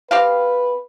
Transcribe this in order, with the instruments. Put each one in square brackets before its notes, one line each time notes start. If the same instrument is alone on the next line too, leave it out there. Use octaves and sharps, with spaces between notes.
[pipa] C4 G4 F5 [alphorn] B4